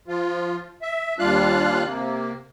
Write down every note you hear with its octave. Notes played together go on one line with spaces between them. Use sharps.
F3 F4
E5
D#2 G3 D4 F4 F5 F#6
C3 A#3